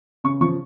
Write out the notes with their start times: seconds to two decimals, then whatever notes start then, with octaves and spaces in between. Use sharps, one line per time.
0.24 C#3 C#6
0.41 F3 C#6